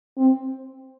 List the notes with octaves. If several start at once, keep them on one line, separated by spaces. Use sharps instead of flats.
C4